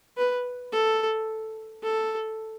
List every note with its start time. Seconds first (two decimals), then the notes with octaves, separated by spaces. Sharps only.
0.18 B4
0.73 A4
1.83 A4